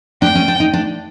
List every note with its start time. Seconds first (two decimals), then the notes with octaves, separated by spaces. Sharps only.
0.22 D4 G5
0.35 C#4
0.48 D4
0.60 D#4
0.73 D4